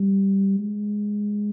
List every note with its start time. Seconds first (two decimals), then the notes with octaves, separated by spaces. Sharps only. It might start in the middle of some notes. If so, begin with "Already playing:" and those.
Already playing: G3
0.59 G#3